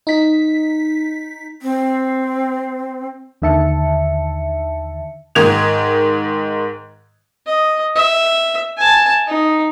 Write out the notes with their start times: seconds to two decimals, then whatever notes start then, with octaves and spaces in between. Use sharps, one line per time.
0.07 D#4 B6
1.62 C4
3.42 D#2 D3 D#3 E5 A5 C#7
5.35 G#2 D#3 G#6 F7
7.46 D#5
7.95 E5
8.77 G#5 A5
9.27 D#4